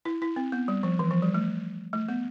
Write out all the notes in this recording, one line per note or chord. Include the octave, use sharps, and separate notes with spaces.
E4
E4
C4
B3
G3
F3
E3
F3
G3
A3
A3
B3